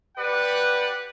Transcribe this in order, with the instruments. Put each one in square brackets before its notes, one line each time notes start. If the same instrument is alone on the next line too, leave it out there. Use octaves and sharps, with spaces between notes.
[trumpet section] G4 B4 D5 F#5